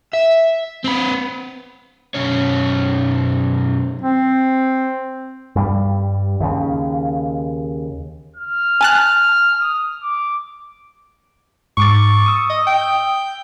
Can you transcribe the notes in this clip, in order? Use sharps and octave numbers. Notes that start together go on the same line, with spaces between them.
E5
C4 B4
F#2 B2 C#4 C#5
C4
G2 G3
D#2 C#3
F6
G#5 A5 F#6
D#6
D6
G#2 C#6 D6 A6
D#6 E6
D#5
G5